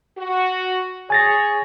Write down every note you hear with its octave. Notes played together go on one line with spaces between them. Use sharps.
F#4
G#4 C#5 G#5 A6 A#6